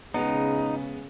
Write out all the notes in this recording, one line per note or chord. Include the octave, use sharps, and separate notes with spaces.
C#3 G#3 B3 D#4